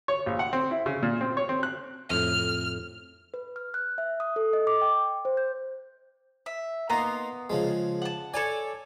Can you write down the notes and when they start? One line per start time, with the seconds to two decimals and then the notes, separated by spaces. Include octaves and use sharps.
0.08 C#5
0.26 A#1
0.39 F#5
0.53 C4
0.71 E4
0.86 C#3
1.03 A#2
1.21 C4
1.37 C#5
1.49 C4
1.63 F#6
2.10 F2 A2 F6
3.34 B4
3.56 F6
3.74 F#6
3.98 E5
4.20 D#6
4.36 A4
4.53 D#5
4.67 D6
4.81 G5
5.25 C5
5.37 G6
6.46 E5
6.90 A#3 B3 D#4 A#5 C6
7.50 C#3 F3 G#3
8.02 F#5 A5
8.34 A4 C#5 D5 G#5